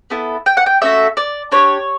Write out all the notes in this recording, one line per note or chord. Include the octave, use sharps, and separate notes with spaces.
B3 E4 A4
G5
F#5
G5
A3 C#4 F#4 A4 E5
D5
D4 G4 C#5